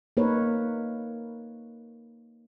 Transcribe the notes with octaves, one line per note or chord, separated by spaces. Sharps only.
A#3 D#4 A#4 B4 C#5